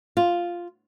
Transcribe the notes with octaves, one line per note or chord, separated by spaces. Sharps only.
F4